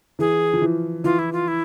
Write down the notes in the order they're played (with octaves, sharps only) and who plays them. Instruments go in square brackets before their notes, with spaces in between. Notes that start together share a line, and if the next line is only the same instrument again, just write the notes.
[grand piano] E3 [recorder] G#4
[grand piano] F3
E3
[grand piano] E3 [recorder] F4
[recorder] E4
F4
E4